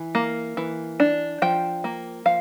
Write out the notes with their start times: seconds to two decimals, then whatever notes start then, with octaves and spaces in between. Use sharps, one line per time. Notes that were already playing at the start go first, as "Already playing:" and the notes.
Already playing: E3
0.15 A#3
0.57 E3
1.00 D4
1.42 F3 G5
1.84 A#3
2.25 F3 F5